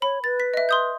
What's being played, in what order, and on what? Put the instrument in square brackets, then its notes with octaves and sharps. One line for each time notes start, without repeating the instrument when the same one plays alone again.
[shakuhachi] C#5 [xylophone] B5
[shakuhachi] B4 [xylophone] A6
[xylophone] B6
D#5 E5
C6 D#6 G6